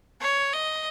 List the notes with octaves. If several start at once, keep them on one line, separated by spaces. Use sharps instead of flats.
C#5
D#5